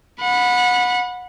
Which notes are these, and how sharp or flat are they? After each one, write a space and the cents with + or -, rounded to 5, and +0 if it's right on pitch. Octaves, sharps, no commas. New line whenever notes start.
F#5 -30 B5 +0